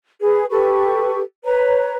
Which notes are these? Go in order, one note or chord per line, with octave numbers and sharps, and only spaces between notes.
G#4 B4
G4 A4 B4 C#6
B4 C#5 A#5